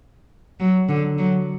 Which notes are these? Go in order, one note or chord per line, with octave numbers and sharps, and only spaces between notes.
F#3
D3
F#3